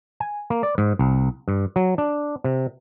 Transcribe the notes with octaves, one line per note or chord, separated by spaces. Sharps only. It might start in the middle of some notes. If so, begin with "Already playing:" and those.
G#5
A#3
D5
G#2
C2
G2
F#3
D4
C3